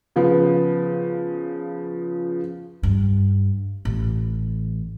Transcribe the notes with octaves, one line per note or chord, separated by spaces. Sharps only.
C#3 F3 B3
G2
A1